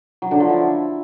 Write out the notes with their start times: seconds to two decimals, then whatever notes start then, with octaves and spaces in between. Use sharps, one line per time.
0.22 F#3
0.31 D3
0.40 F3
0.49 E4